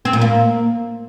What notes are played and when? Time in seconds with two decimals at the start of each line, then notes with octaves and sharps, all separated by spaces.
0.05 C4
0.13 A#2
0.21 A#3